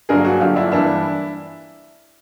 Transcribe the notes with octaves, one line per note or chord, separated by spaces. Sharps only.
G2 D3 F#3 A#3 G#4 A#4
F#4 G#4
G2 D3 F#3 A#3 F4 G4
D4 E4
G2 E3 G3 A#3 D4 E4